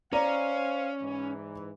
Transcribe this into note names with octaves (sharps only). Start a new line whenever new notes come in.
C#4 C5 D5 F5 A#5
G#2 E3